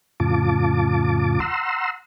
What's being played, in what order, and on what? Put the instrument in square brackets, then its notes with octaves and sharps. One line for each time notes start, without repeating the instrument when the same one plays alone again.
[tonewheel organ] F2 A2 C#3 F4 A5 D6
F#5 A#5 C6 E6